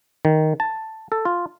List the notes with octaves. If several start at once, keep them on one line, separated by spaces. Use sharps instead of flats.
D#3
A5
A4
F4